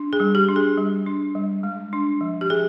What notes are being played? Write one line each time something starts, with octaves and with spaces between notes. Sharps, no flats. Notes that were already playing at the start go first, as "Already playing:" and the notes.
Already playing: D4
G#4
G3
G4
D4
G#4
G3
D4
G3
G#3
D4
F3
G4
F3 G#4